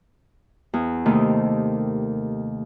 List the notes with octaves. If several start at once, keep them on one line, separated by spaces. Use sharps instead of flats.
E2
D#2 C3 D#3 A3